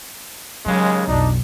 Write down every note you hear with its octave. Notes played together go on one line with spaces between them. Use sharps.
D#2 C#3 F#3 G#3
B1 F2 D4 D#4